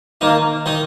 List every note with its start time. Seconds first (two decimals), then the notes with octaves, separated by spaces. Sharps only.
0.21 D#3 A#3 D#4
0.66 D#3 D#4